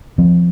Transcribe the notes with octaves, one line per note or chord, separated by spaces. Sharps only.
F3 C4